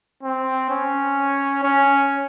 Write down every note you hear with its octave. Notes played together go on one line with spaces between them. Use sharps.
C4
C#4
C#4